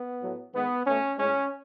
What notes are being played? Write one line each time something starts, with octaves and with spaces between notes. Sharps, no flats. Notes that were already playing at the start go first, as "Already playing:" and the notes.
Already playing: B3
A2 F#3 A3
D#3 G#3 B3
B2 A3 C#4
A2 G#3 C#4